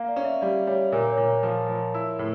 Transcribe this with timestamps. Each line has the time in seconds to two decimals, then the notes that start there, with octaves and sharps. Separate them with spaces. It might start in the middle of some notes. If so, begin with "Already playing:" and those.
Already playing: A#3 F5
0.08 D5
0.16 C#4
0.25 E5
0.42 G3 D5
0.67 G3 C#5
0.92 A#2 A#4
1.10 C#5
1.17 A#2 A#4
1.43 F3
1.69 F3
1.94 E4
2.19 A2